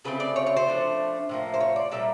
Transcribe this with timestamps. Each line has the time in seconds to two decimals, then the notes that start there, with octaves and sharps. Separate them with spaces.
0.05 C#3 F#3 A3 C4 B4
0.20 D5
0.36 C#5
0.47 C#5
0.57 C5
0.67 F3 A3 D4
1.29 A2 F3 A#3
1.54 C5
1.61 C#5
1.76 D5
1.92 A#2 G3 A#3 E5